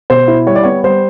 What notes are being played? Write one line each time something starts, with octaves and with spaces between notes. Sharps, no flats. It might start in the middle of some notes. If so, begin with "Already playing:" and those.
B2 C5
E4
G3 C#5
D5
B3 C#5
G3 C5